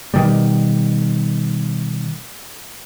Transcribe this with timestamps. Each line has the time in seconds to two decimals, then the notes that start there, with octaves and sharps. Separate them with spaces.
0.14 B2 D#3 G3